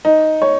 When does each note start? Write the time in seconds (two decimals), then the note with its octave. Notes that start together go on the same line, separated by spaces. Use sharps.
0.05 D#4
0.42 C#5